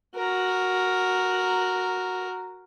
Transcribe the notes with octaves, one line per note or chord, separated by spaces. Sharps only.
F#4 A#4